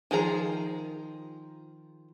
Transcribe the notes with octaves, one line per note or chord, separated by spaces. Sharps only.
D#3 F3 G#4 A#5